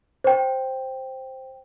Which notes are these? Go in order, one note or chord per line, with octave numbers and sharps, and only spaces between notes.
C5 G5